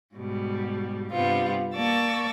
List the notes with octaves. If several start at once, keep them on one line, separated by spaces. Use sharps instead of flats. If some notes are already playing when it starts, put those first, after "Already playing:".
G#2 B2 G3
G2 C3 G3 B3 F4
A#3 D5 A5 C#6 E6 A6